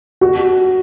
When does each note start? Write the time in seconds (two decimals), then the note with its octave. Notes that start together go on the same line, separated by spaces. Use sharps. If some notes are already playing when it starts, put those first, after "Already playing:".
0.21 F#4